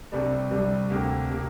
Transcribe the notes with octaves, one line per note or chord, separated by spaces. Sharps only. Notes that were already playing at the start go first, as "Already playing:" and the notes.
C2 C3 G3 D4
C2 C3 G3 D4
D2 C3 A#3 G4
C3 A#3 G4